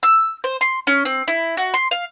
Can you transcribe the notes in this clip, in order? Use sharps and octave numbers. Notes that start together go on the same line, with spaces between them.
E6
C5
C6
C#4
C4
E4
F#4
C6
F5